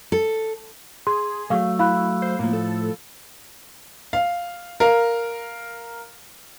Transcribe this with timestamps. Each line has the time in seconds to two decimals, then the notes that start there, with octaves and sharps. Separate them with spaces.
0.12 A4
1.07 G#4 C6
1.50 F#3 A3 F5
1.79 E4 F5 B5 F#6
2.22 C5
2.39 A2 F3 A#3
2.53 A4
4.13 F5
4.80 A#4 F5